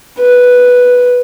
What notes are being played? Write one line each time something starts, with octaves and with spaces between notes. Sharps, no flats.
B4